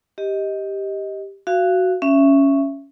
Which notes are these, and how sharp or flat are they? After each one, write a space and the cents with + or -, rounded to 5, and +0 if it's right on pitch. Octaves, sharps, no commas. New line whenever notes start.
G4 +0 D#5 +15
F#4 +0 F5 -25
C#4 +0 E5 +15